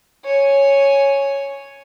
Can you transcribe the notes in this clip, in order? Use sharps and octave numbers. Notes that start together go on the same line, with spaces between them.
C#5 G#5